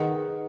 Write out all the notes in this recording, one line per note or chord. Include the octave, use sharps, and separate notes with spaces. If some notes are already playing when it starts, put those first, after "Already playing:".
Already playing: D#3 G#4 B4 D#5 F#5